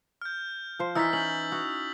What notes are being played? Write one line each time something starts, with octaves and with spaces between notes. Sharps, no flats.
F6 G6
F3 C5
E3 C#4 D#4 E6 A6 B6
C#4 G6 F#7
F#4 D#6